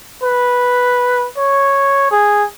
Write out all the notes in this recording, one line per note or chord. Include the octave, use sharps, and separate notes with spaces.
B4
C#5
G#4